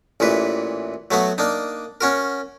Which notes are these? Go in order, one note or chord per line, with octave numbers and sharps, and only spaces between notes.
A1 A#2 E3 B4
F#3 A3 B3 F#4
A#3 D4 D#4
C#4 F#4 A#4